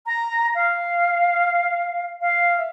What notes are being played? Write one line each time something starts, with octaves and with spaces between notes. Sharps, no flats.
A#5
F5
F5
E5